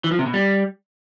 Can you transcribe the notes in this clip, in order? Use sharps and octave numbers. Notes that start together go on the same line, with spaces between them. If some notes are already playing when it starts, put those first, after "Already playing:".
E3
F3
C3
B2
G3